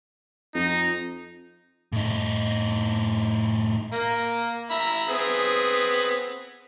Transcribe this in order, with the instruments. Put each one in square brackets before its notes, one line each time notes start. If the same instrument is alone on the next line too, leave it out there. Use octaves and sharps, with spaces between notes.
[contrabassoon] F2 [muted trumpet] D#4
[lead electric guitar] A2 D#4
[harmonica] A#3 A#4
E5 A#5 B5
B3 C4 G#4